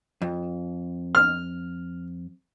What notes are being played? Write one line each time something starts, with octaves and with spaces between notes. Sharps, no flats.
F2
F6